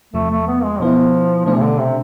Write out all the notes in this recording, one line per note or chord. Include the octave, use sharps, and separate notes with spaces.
E2 C3 F3 A3
A3
B3
G#3
B2 F3 B3 E4
B2 F3 A3 D4
C3
D3
C3